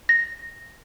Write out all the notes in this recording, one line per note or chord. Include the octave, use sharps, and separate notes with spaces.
A#6